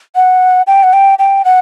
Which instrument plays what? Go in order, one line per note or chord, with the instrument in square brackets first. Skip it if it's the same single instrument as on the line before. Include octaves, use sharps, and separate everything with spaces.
[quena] F#5
G5
F#5
G5
G5
F#5